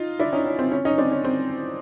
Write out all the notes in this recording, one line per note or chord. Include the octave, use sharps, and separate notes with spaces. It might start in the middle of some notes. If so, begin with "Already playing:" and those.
Already playing: D#4 F4
D4 E4
C#4 D#4
C#4
C4
C#4
C#4 D#4
C4 D4
C#4
C4